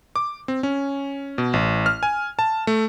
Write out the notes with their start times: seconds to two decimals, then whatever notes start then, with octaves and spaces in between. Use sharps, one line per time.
0.16 D6
0.48 C4
0.63 C#4
1.38 B2
1.53 A1
1.86 F6
2.03 G#5
2.39 A5
2.67 A3